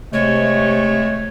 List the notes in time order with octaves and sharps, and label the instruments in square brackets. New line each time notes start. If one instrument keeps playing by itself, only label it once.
[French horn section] C3 [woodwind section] G#3 A3 [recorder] C#5